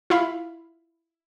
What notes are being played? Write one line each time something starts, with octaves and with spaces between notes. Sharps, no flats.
E4 F4 F5 B5